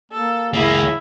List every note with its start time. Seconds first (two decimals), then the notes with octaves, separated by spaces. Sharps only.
0.12 A#3 A4
0.54 C#2 A#3 E4 G#4